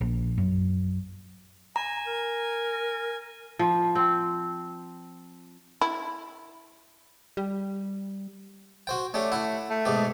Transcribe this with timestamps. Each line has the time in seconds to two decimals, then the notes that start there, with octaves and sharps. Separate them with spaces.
0.01 A#1
0.38 F#2
1.76 G#5 A#5
2.07 A#4
3.59 F3
3.95 C4
5.81 E4
7.37 G3
8.87 F#4 C5 G5
9.14 A3 C#4 D4 G4
9.32 E4 F#5
9.70 A3
9.85 G#2 B2 G4